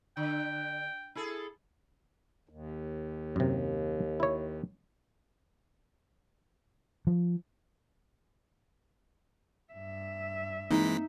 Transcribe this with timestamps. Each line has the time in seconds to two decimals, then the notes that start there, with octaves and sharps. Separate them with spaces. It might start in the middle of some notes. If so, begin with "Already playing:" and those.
0.17 D3 G5
1.15 E4 G#4 A4
2.49 D#2
3.36 F#2 C3
4.20 E4 C#5
7.07 F3
9.73 G2 E5
10.71 E3 G#3 A#3 C4 D#4 B6